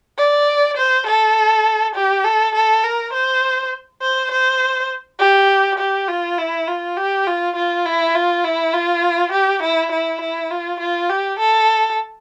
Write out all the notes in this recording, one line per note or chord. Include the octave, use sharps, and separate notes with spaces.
D5
C5
A4
G4
A4
A4
A#4
C5
C5
C5
G4
G4
F4
E4
F4
G4
F4
F4
E4
F4
E4
F4
G4
E4
E4
E4
F4
F4
G4
A4